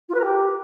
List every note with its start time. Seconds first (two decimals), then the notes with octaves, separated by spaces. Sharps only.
0.09 F4
0.14 B4
0.19 A#4
0.25 G4